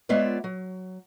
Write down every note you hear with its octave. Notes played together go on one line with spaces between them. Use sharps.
G#3 B3 F4 C#5 D5 E5
F#3